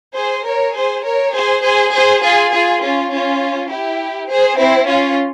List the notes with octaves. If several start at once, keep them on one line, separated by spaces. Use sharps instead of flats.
G#4 C5
A#4 C#5
G#4 C5
A#4 C#5
G#4 C5
G#4 C5
G#4 C5
F4 G#4
F4 G#4
C#4 F4
C#4 F4
E4 G4
G#4 C5
C4 E4
C#4 F4